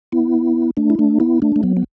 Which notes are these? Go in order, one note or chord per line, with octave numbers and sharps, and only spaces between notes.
B3 E4
A3 D4
E4
A3 D4
B3 E4
A3 D4
A3
F#3 B3
B3